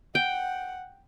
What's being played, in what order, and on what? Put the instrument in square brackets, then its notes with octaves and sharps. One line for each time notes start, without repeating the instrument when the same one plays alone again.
[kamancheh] F#5 [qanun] G5